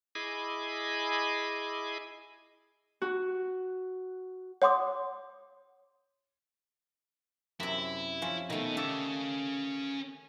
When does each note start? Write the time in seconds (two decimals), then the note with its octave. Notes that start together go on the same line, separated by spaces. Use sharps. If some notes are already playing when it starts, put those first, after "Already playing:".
0.15 E4 G#4 D#5 G#5 B5 D6
3.01 F#4
4.62 C#5 F#5 C6 D6 D#6
7.60 F#2 C3 E4
8.22 F3 C#4
8.50 B2 D#3 A3
8.77 C#4 G4 A4 F5